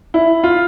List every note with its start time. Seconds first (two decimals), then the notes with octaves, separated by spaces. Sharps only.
0.14 E4
0.44 F4